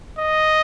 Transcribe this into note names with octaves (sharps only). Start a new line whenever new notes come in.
D#5